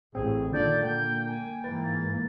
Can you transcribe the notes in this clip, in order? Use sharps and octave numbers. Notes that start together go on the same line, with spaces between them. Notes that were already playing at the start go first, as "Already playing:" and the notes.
A1 A2 C4 G#4
A#2 D3 D#3 D4 D5 G6
A#3 G5 G6
G#5
G#2 E3 A#3 B4 A6